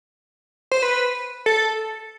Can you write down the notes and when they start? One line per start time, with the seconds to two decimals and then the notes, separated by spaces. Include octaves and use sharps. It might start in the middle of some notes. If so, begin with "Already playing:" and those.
0.72 C5
0.82 B4
1.46 A4